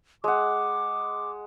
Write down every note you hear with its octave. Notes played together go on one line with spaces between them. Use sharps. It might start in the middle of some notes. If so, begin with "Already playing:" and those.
G#3 F#5 D6